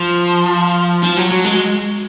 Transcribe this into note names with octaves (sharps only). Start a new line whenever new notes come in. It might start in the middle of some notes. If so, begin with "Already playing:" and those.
Already playing: F3
F3
F#3
F#3
G#3